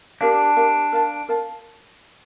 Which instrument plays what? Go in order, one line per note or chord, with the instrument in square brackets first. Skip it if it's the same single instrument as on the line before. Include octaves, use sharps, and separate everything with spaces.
[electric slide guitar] D4 [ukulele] G4 A#4 F5
[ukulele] G4 A#4 F5
A#4 F5 A5
A#4 F5 A5